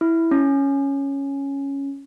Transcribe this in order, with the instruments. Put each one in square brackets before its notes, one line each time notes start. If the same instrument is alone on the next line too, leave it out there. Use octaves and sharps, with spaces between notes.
[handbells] E4
C#4